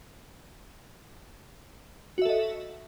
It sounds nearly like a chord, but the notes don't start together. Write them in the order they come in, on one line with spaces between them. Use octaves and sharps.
F#4 E5 A4 D#5